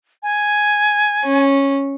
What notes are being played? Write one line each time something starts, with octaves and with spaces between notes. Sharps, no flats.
G#5
C#4